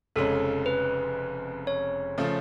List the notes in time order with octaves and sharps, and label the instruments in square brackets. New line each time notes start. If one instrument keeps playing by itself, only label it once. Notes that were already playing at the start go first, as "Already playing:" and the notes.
[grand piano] F1 F2 C#3 G#3 C#4 [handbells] A4
[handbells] B4
C#5
[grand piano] C#3 F3 A3